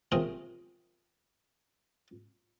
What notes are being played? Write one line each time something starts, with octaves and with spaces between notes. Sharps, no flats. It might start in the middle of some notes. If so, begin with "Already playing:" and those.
C3 F3 C#4 G#4 A#4 G5